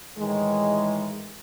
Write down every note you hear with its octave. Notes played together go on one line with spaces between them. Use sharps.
A2 D#3 E3 G#3